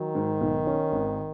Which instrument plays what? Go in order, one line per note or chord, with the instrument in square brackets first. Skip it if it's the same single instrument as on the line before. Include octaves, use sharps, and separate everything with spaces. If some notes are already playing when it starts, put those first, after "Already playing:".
Already playing: [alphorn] D#3 [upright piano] F#3
[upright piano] G#2
B1
C#4
G#1